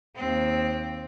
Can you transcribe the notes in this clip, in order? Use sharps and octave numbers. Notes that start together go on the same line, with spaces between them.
D#2 C4